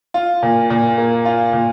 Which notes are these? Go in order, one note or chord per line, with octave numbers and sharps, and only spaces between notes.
F4
A#2
A#2
A#3
F4
A#2